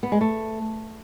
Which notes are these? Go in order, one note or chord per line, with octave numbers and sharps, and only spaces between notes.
B3
G#3
A3